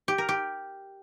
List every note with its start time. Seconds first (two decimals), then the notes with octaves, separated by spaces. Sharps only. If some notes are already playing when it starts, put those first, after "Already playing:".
0.08 G4
0.18 A#4
0.29 G4